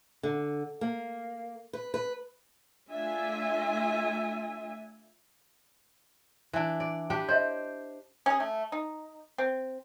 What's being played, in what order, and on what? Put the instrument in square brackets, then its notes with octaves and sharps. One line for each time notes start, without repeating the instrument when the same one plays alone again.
[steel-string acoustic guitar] D3
A#3
B4
B4
[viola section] A3 D4 F4 E5 G#5
[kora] E3 D4
D5
[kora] D4 G4 B4 [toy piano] G5
[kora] C5 [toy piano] C#5 D#5 E5
[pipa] C#4 G#4
A3
D#4
C4